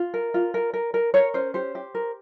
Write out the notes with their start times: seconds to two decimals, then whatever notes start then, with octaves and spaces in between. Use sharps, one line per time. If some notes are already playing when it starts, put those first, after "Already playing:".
Already playing: F4
0.14 A#4
0.34 F4
0.54 A#4
0.74 A#4
0.94 A#4
1.14 A#4 C#5
1.34 C#4 C5
1.54 G4 C5
1.75 G4
1.95 A#4